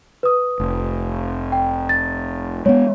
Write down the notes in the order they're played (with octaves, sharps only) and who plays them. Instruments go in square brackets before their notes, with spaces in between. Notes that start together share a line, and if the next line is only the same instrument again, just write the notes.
[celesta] B4 D#6
[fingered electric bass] F1
[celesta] G5
A6
[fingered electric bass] G#3 A#3 B3 [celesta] C#5